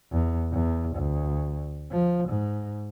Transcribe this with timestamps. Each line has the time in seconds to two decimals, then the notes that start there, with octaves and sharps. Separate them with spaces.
0.12 E2
0.53 E2
0.96 D2
1.92 F3
2.29 G#2